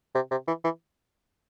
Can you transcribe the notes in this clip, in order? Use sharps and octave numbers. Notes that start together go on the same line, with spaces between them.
C3
C3
E3
E3